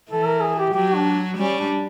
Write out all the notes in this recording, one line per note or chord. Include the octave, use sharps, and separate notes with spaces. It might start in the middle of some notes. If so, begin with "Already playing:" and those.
E3 A4
A#4
G#4
G4
F#3 G4
D4
G3 C#4
D4